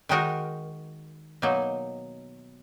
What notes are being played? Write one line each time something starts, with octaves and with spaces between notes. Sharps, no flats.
D#3 G#3 D#4 F#4 A#4
B2 F#3 A#3 D#4